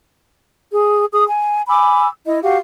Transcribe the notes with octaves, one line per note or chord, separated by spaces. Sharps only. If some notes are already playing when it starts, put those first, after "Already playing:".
G#4
G#4 D#6
G#5
G#5 B5 D6 E6
E4 D#5
F#4 G4 F5